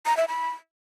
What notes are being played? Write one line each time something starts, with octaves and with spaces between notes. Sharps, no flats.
A#5
E5
B5